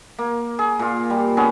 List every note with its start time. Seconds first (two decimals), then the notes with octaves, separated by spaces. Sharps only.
0.18 A#3
0.59 G#4
0.79 A#2 F4
1.10 G3
1.37 B3 C#4 G#4